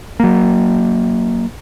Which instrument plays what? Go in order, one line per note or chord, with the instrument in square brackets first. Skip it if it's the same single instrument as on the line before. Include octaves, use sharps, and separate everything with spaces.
[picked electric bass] F#3 A#3